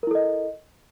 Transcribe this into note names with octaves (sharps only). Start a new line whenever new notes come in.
E4 A4 A#4 D#5